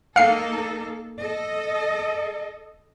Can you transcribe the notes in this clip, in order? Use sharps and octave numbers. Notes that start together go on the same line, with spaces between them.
A#3 D#4 A4 F5 C7
A4 D#5